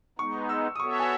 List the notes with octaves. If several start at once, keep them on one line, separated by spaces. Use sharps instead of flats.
G#3 B3 D#4 C#6
E6
D#6
B3 F#4 A4 C#5 E5 C#6
G#5